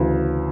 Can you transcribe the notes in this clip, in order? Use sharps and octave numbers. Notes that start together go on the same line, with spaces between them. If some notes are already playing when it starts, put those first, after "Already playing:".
Already playing: D2 C#3 E3